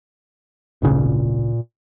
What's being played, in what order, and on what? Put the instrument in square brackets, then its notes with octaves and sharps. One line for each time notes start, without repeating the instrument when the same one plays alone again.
[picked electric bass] D1 G#1 C#3 [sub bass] A#2